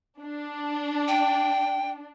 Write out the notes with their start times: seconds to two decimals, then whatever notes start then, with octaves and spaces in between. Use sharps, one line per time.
0.22 D4
1.08 G5